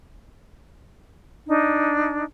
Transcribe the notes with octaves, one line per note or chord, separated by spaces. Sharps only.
D4 D#4